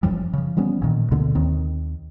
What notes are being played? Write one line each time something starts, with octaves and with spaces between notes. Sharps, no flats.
F#1 F#2 F3 G3
C#3 F3
F3 G3 B3 C#4
A1 A#2 D#3
D2 B2 D3 A3
D#2 D#3 C4